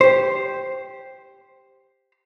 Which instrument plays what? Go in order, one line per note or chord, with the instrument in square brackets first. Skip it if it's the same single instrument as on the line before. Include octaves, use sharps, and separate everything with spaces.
[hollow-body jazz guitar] G4 C5